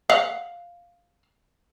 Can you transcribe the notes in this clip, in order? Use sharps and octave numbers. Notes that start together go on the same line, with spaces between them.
F5 F#5